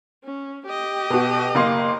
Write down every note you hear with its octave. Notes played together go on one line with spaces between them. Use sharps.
C#4
G4 D#5
B2 F#4
F#1 A#3 C6